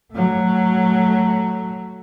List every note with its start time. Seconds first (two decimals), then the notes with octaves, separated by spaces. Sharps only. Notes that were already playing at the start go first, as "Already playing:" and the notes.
0.13 F#3 A3